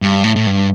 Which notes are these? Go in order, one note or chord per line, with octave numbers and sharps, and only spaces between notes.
G2
A2
A2
G2